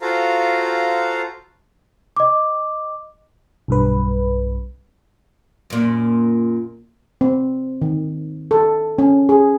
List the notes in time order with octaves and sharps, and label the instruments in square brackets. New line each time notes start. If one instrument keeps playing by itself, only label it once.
[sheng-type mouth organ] F4 F#4 A4 C5 F5 A#5
[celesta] D#5 D6
[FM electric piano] B1 G2 B4
[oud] F#2 A#2
[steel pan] C4
D#3
A4
C#4
G#4